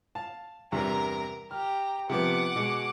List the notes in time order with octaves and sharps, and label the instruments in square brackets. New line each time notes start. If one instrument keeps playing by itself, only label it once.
[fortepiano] F5 A5
[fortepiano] E2 G2 C3 [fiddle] A#4 A#5
[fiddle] G4 A#5 [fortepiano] F6
[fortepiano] C3 F3 B3 [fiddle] F#5 D6
[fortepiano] B2 G#3